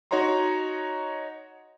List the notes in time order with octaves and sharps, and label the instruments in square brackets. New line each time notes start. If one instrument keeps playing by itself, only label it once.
[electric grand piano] D#4 F#4 C#5 D#5 A#5 C6